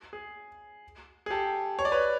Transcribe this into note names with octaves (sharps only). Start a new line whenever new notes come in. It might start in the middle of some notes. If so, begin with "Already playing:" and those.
G#4
G#4
G4 A4
C#5
D5
B4 C#5